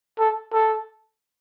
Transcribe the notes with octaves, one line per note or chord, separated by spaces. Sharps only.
A4
A4